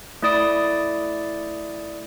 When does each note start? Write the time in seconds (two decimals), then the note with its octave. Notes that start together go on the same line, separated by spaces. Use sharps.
0.22 A3 E4 D5 D#6 D7